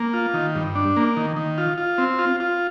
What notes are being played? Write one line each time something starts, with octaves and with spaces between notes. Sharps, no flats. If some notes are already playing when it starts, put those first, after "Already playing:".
Already playing: A#3
F4
D#3
G2
D4
A#3
D#3
D#3
F4
F4
C4
F4
F4